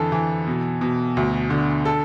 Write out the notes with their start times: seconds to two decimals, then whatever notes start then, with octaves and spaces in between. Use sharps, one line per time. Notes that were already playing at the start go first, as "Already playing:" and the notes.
Already playing: F2 D3 E3 A4
0.12 E3
0.47 B2
0.81 B2
1.17 D2
1.50 D3
1.85 A4